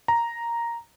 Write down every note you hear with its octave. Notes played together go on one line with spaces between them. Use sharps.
A#5